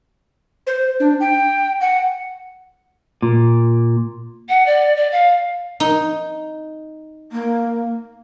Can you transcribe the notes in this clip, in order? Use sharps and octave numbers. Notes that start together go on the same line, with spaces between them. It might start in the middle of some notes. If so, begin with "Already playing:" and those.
C5
D4
G5
F#5
A#2
F#5
D5
D5
F5
D#4
A#3